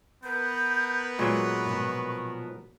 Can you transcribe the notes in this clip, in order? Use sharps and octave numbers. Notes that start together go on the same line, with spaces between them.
B3 A#4 B4 G6
A#2 F#3 G#3 C#6
G#2 B2 F3